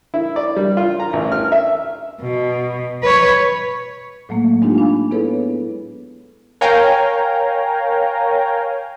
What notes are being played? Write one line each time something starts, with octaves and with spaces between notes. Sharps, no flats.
E4
D5
G3
F4
A#5
A1
F6
E5
B2
B4 C#5
A2 F#3 A3 A#3
G#3 C4 D4 D#4 F4 G4
D4 F5 G#5 B5
B3 E4 G#4 A4 B4 C#5
A#4 C#5 F5 G5 G#5 A#5